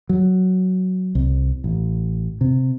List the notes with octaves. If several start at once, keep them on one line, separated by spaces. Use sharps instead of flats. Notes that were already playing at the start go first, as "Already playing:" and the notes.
F#3
C2
A1
C3